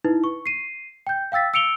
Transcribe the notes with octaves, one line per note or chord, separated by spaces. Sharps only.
D#4 E4 B4
C#6
C7 D#7
G5 G6
F5 G5 E6 A6 B6
E6 C#7 D7 F7 G7